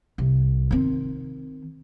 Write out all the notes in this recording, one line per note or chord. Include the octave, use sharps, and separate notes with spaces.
C2
D#3 C4